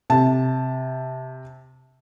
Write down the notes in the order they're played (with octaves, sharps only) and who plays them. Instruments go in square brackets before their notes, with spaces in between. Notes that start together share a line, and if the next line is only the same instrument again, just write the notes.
[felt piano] C3 A5